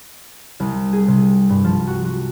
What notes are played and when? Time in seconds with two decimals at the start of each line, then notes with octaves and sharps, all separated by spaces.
0.60 C2
0.93 G#4
1.08 C3
1.49 G2
1.64 F3
1.87 F#4
2.05 F#4